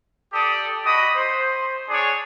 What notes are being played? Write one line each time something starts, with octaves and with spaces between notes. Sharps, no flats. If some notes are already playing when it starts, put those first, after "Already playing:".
G4 A4 D5 D#6
F#4 D#5 B5 D#6
C5
D4 G#4 C#5 D5